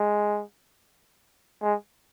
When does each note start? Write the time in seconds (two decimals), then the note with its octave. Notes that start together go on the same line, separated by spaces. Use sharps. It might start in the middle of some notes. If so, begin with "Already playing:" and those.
Already playing: G#3
1.62 G#3